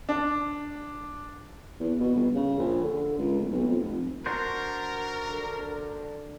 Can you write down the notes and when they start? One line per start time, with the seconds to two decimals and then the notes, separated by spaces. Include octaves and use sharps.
0.09 D4
1.80 E2
2.00 B2
2.15 G1
2.35 C#3
2.58 A#1
2.83 D3
3.18 C#2
3.40 D1
3.51 B1
3.68 F2
3.79 F1
4.26 D4 F#4 A#4 C5
5.30 D3